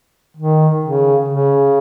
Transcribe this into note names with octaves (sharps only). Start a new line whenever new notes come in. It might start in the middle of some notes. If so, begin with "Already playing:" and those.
D#3
C#3
C#3